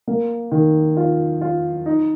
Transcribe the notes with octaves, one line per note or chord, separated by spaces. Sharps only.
A#3
D#3
F4
F4
D#4